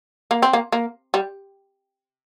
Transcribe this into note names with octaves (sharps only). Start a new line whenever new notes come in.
A#3
C4
A#3
A#3
G3